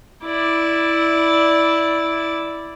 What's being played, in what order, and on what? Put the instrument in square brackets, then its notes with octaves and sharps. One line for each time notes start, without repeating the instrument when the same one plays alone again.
[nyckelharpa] E4 D5